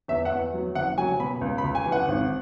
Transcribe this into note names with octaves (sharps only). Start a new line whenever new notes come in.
E2 E5
F#5
E2
F#3
F#1 F#5
F#3 G#5
B2 B5
C#2
B5
C#2
G#5
E3
F#5
G#1